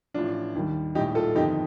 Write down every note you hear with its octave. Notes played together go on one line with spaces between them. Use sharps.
A1 A2 F3 D4 F4
D#2 D#3 G3
A#1 A2 G3 D#4 G4
F4 A4
G1 F2 D#3 D#4 G4